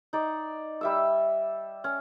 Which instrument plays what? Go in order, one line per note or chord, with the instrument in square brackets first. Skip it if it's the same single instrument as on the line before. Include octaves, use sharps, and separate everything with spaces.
[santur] D#4 D5
G3 E5 E6
C#4